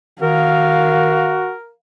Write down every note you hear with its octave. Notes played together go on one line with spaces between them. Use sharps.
D#3 F#4 A#4 F5